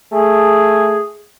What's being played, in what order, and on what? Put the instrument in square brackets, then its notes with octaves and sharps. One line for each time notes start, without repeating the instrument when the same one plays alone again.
[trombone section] A3 G#4